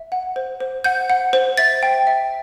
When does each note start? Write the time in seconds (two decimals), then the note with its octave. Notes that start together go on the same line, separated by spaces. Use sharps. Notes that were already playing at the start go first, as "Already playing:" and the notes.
Already playing: E5
0.12 F#5
0.36 C5
0.60 C5
0.84 F#5 G6
1.10 F#5
1.33 C5
1.57 E5 A6
1.83 G5
2.07 E5